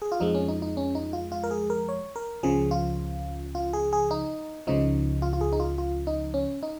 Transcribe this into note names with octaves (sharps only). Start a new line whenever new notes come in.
G#4
F4
F2 F3 G#3 D#4
C#4
D#4
D#4
C#4
D#4
F4
F4
A#4
G#4
A#4
C#5
A#4
C#2 C#3 F3 G#4
F4
F4
G#4
G#4
D#4
C#2 C#3 F3 D#4
F4
F4
G#4
D#4
F4
F4
D#4
C#4
D#4